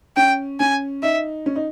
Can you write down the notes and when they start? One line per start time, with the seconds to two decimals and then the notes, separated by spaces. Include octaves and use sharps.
0.16 C#4 G5
0.60 C#4 G#5
1.02 D#4 E5
1.46 C#4
1.56 D#4